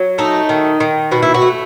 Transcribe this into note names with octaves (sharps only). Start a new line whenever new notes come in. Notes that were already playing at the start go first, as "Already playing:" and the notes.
Already playing: F#3
A3 D#4
D#3
D#3
B2 F#4
E4
F#4
A3